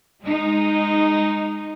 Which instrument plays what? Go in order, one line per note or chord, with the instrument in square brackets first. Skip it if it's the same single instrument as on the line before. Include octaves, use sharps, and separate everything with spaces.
[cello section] G#3 D#4